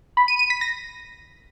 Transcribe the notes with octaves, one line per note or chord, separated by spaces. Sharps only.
B5
D#7
D#7
B6
A#6